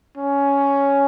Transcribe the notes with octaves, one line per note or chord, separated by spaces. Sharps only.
C#4